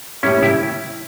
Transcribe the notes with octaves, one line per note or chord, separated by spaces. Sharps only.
A2 G3 A#3 C#4 E4
E4 G4